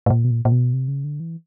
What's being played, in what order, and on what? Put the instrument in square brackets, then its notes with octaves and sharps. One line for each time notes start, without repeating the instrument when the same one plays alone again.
[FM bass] A2
A#2
B2
A#2
A#2
B2
C3
C#3
D3
E3